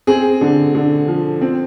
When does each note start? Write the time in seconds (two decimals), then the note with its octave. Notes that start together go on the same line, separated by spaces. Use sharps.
0.07 C4 G#4
0.41 D3
0.75 D3
1.08 F3
1.41 C4